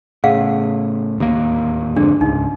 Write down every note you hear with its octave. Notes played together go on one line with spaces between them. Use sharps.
A2 C#3 G#4 F5 F#5
D1 D#2 A#3
F2 G#2 D3 D4
C#2 G#2 D#4